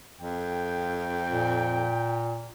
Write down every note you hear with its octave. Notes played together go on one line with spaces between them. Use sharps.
F2 G5
A#2